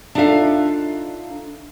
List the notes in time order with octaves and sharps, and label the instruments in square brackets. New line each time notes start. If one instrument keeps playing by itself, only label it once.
[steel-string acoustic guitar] D4 D#4 F4 A4 E5 F5